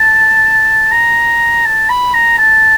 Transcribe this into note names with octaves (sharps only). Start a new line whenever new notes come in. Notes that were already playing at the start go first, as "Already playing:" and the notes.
Already playing: A5
A#5
A5
B5
A#5
A5